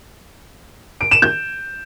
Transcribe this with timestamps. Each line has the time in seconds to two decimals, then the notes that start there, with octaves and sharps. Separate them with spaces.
1.01 D7
1.11 E7
1.22 G6